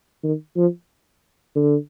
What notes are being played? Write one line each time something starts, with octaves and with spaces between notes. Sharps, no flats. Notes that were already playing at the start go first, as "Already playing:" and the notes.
D#3
F3
D3